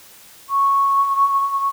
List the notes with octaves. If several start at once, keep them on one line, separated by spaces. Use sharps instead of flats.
C#6